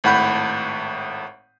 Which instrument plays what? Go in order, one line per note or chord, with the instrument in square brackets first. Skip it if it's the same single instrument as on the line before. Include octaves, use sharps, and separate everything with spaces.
[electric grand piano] G#1 A2 F#5 B5 G6